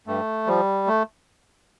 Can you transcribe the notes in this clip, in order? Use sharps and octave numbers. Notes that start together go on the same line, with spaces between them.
G2 A3
F3 G3
A3